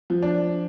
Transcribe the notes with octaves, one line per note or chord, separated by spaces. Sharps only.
F3
D4